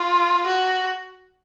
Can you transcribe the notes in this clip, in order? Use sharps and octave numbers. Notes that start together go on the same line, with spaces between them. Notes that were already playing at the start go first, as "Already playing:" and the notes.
Already playing: F4
F#4